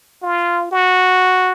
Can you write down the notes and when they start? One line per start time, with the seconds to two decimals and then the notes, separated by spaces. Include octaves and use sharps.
0.22 F4
0.71 F#4